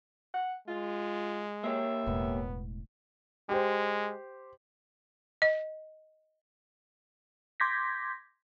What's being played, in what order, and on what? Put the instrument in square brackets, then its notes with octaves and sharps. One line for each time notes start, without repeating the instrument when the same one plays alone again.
[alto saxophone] F#5
[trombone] G#3 [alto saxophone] F4
[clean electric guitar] A#3 G4 C#5 [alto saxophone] E5
[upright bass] E1 A2 [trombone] B3
[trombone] G#3 [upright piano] G4 C5
[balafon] D#5
[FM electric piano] C6 D6 G6 G#6 A#6 B6